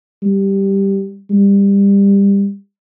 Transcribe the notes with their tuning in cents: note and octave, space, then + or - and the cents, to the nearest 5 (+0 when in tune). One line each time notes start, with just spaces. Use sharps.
G3 +0
G3 +25